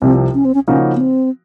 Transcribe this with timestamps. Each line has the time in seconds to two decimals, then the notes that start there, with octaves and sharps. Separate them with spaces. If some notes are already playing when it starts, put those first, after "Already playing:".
0.02 C2 C3 F3 C4
0.34 C#4
0.45 C4
0.54 C#4
0.68 C#3 F3 A#3 C#4 D#4 F#4
0.96 B3
1.00 C4